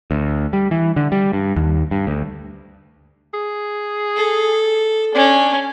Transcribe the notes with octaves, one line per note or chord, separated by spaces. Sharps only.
D2
G3
E3
D3
G3
G2
D#2
G2
D2
G#4
A4
C#4 D4